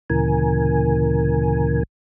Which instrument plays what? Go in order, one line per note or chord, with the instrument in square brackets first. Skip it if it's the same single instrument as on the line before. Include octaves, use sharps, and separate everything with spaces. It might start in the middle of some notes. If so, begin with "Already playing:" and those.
[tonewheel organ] D2 A#2 C#3 E3 A#4 G#5